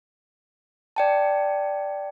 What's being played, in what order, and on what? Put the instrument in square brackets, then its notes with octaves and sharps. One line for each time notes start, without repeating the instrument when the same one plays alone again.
[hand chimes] D5 G5 A5